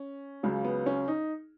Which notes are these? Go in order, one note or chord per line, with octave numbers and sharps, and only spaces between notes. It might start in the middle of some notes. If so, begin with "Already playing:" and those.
Already playing: C#4
C#2 C#3 F#3
B3
C#4
D#4